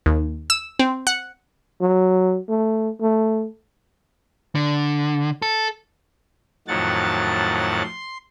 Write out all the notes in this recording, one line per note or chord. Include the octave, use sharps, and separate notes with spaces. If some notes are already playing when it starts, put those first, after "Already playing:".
D#2
E6
C4
F#5
F#3
A3
A3
D3
A4
F2 A2 D#3 F#3 F#5 A6
C6